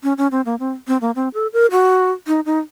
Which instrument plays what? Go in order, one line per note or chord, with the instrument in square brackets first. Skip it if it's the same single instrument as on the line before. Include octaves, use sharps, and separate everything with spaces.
[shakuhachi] C#4
C#4
C4
A#3
C4
C4
A#3
C4
A4
A#4
F#4
D#4
D#4